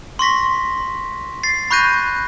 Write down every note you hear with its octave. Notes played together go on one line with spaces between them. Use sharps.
C6 C#6 A#6 B6
A6 C7
B5 C#6 F#6 G6 A#6 D#7